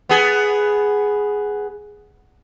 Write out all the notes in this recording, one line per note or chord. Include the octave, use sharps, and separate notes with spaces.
B3 G#4